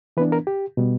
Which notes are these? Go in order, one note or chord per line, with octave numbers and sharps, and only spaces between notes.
E3 B3 D4 B4
A#4
G4
B2 G3 B3